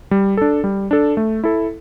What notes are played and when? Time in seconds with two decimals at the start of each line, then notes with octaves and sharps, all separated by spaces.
0.11 G3
0.37 D4 A4
0.64 G3
0.91 D4 A4
1.17 A3
1.44 E4 A4